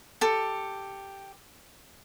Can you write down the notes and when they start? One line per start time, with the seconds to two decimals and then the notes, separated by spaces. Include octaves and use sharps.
0.21 G4 A4